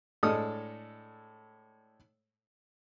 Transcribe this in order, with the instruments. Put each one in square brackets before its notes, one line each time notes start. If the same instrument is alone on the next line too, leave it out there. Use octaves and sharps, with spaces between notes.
[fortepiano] A2 G#3 D4 A4 D#6 F6